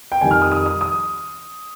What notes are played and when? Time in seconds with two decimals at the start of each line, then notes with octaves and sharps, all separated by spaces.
0.12 G5
0.21 F2 D#3 G3 G#5
0.31 F6
0.42 D#6
0.52 D#6
0.66 D#6
0.81 D#6